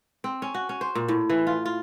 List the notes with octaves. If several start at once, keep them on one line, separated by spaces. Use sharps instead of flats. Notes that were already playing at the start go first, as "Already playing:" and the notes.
C4
C#4
F#4
C#4
C5
A#2
A2
E3
F4
F4